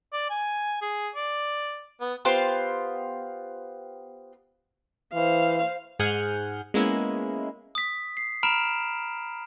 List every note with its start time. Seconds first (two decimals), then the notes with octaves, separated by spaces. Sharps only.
0.13 D5
0.30 G#5
0.82 G#4
1.15 D5
2.01 B3
2.25 B3 F4 G4 C5
5.14 E3 C5 F5
5.99 G#2 G#4 F#5 G#5 F6 G6
6.74 G#3 A#3 B3 C#4 E4
7.75 D#6 B6
8.17 C7
8.43 A#5 B5 F6 D7 E7 F7